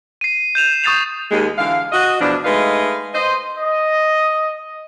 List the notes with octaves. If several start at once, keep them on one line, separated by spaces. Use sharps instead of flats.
C7 D#7
G6 E7 F7
C#6 D#6 G6 A6 C7 F7
D#2 G#3
D3 E3 F5
F#4 D#5
E2 B2 F3 D4
G#3 A3 D#4 B4 F5
C5 D#5
D#5